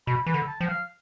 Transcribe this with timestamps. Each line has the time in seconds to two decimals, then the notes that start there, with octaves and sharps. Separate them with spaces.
0.07 B2 B5
0.26 E3 B5
0.34 D3
0.47 A5
0.61 F3 G5
0.67 F5